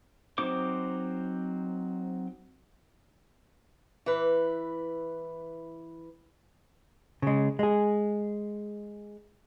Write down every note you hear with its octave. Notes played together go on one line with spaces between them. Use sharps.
F#3 C4 D#4 C5 D6
E3 B4
C#3 G#3
G#3 G#4